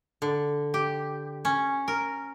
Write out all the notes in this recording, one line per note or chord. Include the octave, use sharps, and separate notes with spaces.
D3
G4
C#4
A#4